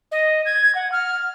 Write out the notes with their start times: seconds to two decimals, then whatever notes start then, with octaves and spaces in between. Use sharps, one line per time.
0.12 D#5
0.46 G#6
0.75 F#5
0.92 F6